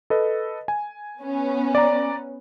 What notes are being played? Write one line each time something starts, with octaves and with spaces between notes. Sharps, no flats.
A4 B4 D#5
G#5
B3 C#4
D5 A#5